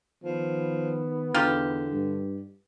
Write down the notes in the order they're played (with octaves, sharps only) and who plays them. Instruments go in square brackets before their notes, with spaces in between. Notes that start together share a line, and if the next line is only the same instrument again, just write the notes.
[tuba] D#3 [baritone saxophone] F3 [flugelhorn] B3
[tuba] E2 [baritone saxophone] D3 [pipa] D#4 F4 G4
[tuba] G2